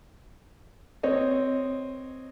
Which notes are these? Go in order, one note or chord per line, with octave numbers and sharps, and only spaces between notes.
C4 C#5 D#5